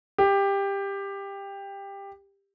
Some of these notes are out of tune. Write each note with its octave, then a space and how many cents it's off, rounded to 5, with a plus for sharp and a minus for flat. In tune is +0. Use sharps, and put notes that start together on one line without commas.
G4 +15